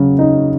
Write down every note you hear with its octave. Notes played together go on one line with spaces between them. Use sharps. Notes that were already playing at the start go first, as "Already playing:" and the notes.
Already playing: C#3 F#3
D#4